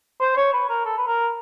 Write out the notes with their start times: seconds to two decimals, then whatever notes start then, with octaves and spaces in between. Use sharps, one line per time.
0.20 C5
0.36 C#5
0.53 B4
0.69 A#4
0.85 A4
0.97 B4
1.07 A#4